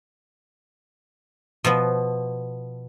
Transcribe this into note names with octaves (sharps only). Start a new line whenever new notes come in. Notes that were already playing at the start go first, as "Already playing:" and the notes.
B2 F3 B3